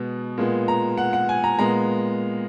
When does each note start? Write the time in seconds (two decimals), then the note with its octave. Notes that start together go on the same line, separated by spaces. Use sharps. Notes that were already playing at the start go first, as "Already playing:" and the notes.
Already playing: B2 G#3 B3
0.38 A#2 G#3 B3
0.68 A#5
0.97 F#5
1.13 F#5
1.29 G#5
1.44 A#5
1.59 A#2 G#3 B3 A#5